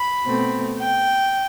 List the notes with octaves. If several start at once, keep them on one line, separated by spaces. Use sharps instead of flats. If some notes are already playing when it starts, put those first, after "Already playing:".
Already playing: B5
B2 A3 C4
G5